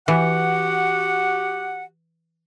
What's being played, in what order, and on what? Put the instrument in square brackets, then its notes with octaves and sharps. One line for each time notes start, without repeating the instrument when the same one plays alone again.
[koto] E3 [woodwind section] F#4 G4 F#5